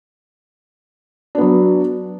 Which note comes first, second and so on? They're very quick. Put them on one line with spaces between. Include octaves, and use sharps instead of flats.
D4 B3 F#3